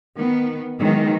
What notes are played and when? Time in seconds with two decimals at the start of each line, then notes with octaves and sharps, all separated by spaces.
0.15 D#3 B3
0.79 D#3 E3 F#3 G#3 B3